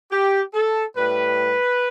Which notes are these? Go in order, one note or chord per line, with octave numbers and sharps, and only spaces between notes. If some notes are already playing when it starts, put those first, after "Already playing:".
G4
A4
A2 G3 B4